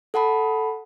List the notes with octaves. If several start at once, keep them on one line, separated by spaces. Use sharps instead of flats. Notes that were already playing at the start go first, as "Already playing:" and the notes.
A4 F#5 A5 B5